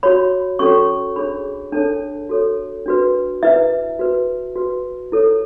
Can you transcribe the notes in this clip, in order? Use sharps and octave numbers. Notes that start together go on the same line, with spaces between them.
F#4 C#5 B5
C#4 F#4 A4 C#5 C#6
D4 G#4 C#5 B5
D4 A4 C#5 A5
F#4 A4 C#5
D4 F#4 B4
E4 B4 E5
F#4 B4
F#4 B4
E4 A4 C#5